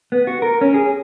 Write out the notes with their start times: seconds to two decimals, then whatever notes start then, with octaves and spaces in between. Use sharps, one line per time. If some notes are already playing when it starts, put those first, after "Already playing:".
0.12 B3
0.27 F#4
0.42 A#4
0.61 C#4
0.74 G#4